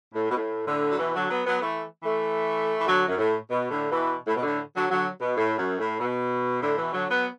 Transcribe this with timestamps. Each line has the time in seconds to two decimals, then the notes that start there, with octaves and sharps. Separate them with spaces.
0.14 A2
0.31 B2
0.36 A2
0.67 A2 D3
0.90 F#3
0.98 B2 E3
1.14 D3 F#3
1.30 F#3 B3
1.45 F#3 B3
1.61 E3 A3
2.03 E3 A3
2.77 E3
2.86 D3 F#3
3.09 F#2
3.18 A2
3.48 B2
3.70 A2 D3
3.90 B2 E3
4.27 A2
4.37 B2
4.43 A2 D3
4.74 D3 F#3
4.90 D3 F#3
5.21 B2
5.37 A2
5.58 F#2
5.79 A2
6.00 B2
6.62 A2 D3
6.78 B2 E3
6.93 D3 F#3
7.09 F#3 B3